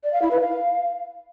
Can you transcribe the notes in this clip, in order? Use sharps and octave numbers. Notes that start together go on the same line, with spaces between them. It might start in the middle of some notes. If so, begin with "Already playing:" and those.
D5
F5
E4
B4
F5